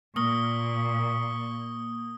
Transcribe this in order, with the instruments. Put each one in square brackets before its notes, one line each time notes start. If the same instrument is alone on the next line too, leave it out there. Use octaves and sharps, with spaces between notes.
[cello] A#2 [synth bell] A#3 [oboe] C#6 [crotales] D#6 G7